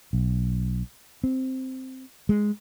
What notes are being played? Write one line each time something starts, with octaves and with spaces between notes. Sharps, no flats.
B1
C4
G#3